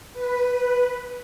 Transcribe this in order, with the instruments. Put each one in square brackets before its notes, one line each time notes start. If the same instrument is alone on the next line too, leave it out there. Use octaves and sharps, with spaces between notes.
[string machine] B4